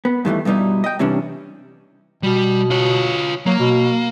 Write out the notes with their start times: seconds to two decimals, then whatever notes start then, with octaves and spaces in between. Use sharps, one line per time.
0.05 B3
0.25 G2 D#3 E3 A3
0.45 G2 B2 G3 D#4 E4
0.84 D#5 G5
0.99 C3 E3 G3 C#4 D4
2.23 B2 G3
2.71 F4 C#5
3.46 F#3 A#3
3.60 B2